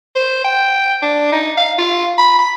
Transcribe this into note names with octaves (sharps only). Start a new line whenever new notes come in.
C5
G5
D4
D#4
F5
F4
B5
B5